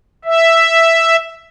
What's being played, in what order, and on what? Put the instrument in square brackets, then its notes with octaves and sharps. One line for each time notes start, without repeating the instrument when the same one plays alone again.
[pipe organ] E5